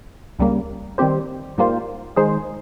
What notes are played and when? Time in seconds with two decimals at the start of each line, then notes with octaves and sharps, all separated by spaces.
0.39 C#2 C#3 G3 A#3
0.98 D#3 G3 C4 G4 C5
1.58 G#2 G3 A#3 F4 C5
2.16 D#3 G#3 D#4 G#4 C5